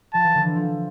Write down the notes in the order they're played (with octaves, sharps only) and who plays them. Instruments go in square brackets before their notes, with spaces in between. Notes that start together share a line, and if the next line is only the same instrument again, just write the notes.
[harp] F3 [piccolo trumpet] A5
[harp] E3
D3
E3
F3